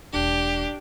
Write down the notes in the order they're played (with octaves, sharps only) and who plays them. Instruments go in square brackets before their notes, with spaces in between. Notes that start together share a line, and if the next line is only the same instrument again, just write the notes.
[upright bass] E1 [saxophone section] D4 [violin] G4